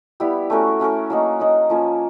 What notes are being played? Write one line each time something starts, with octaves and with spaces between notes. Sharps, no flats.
G3 B3 E4 G4
A3 C#4 F#4 A#4
A3 C#4 F#4 A#4
F#3 A#3 D#4
F#3 A#3 D#4
F3 A#3 C#4